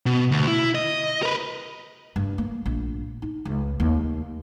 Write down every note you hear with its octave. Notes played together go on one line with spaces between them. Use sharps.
B2
D2
E4
D#5
A#4 B4
G2
A#3
A#1
D#4
C#2
D#2